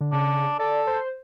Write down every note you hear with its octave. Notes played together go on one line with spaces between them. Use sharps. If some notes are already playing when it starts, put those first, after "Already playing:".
D3
C#3 D4
A4 D5
C5